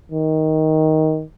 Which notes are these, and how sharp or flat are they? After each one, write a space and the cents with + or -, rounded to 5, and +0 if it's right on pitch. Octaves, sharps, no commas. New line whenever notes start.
D#3 +10